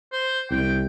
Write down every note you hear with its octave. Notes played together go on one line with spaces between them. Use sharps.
C5
C2 G5